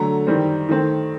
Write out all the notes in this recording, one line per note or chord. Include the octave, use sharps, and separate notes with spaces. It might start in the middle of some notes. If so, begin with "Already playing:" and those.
Already playing: D3 F#3 A3 A#5
D#3 G3 C4
D#3 A3 C4